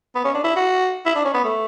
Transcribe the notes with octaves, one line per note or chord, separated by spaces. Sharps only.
B3
C#4
D4
E4
F#4
E4
D4
C#4
B3
A3